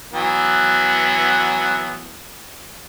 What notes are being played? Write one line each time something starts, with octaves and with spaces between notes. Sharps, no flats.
E3 F#3 B3